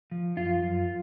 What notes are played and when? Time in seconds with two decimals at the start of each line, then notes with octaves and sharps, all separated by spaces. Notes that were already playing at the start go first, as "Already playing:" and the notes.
0.11 F3
0.37 F#2 F4
0.62 F#2